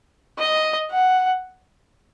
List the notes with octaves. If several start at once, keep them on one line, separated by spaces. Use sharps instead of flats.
D#5
F#5